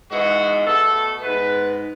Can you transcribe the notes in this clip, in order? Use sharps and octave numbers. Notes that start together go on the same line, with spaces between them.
G#2 E3 G#3 B3 F#4
B2 A3 A4
G#2 G#3 B3 B4